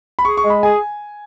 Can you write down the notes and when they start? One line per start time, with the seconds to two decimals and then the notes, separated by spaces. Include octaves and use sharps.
0.19 B5
0.25 G#4 C#6
0.37 C#6
0.44 G#3
0.50 B5
0.63 G#4 G#5